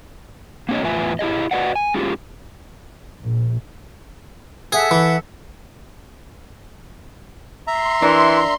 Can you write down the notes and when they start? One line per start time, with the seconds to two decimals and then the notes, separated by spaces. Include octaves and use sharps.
0.69 A#3 C4 D4 G4 C#5 D#5
0.83 E2 A2 F4 B4 E5 G#5
1.19 E4 G4 G#4 D#5
1.51 F#4 B4 D5 D#5 F#5
1.75 G#5
1.94 G#3 C#4 F4 G4 G#4
3.22 A#1
4.72 G#4 A4 E5 F#5
4.91 E3
7.67 E5 A#5 C6
8.02 E3 D4 A#4